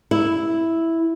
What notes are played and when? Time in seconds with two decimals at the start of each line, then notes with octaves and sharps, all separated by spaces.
0.11 E4